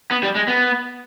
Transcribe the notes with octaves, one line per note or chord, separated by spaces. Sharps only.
B3
G3
G#3
B3